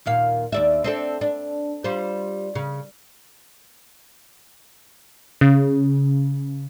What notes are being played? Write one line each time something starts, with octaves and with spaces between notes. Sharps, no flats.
D#2 A#2 F5
D#2 D5 E5
C4 D4 A4
D4
G3 F4 C5
C#3
C#3